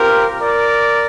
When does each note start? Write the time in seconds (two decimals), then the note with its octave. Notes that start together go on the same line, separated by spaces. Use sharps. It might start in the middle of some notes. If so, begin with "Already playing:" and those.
Already playing: C4 F4 G4 A#4
0.41 A#4 D5